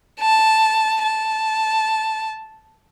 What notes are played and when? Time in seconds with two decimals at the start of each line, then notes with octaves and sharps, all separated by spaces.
0.20 A5
1.04 A5